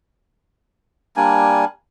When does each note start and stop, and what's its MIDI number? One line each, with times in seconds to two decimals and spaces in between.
1.17 1.65 55
1.17 1.65 58
1.17 1.65 62
1.17 1.65 80